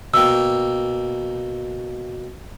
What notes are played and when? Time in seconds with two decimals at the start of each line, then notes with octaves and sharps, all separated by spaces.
0.14 B2 A#3 G5 E6